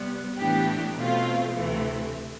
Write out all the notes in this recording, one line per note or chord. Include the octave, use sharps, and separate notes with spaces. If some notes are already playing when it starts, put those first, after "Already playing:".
Already playing: C3 G3 B3
A2 E3 B3 D4 G4
B2 A3 C4 F4
D2 C3 E3 A3